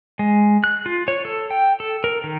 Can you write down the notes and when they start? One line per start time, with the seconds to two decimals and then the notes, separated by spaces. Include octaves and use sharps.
0.19 G#3
0.64 F#6
0.86 F4
1.08 C#5
1.25 A4
1.50 G5
1.80 A4
2.04 A#4
2.24 D#3